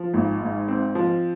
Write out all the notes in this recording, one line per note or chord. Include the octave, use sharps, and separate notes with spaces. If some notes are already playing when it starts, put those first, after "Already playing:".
Already playing: F3
G#1
G#2
C4
F3